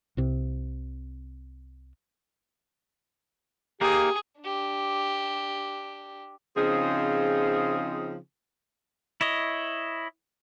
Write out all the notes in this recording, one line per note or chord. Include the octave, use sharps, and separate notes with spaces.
C2 C3
A#3 D#4 G4 G#4
D4 G4
C#3 F3 C4 D#4 F4 G#4
E4 C#5 D#5